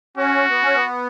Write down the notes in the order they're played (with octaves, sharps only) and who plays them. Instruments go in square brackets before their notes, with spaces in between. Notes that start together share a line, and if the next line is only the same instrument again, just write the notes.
[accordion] C#4 [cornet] F#4
[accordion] B3
C#4
B3